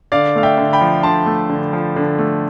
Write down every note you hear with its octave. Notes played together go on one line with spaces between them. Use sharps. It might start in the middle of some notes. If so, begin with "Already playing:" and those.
D3 D5 F5
A3 F5
E5 G5
D3
G5 B5
F3
D3 A5 C6
A3
D3
F3
D3
A3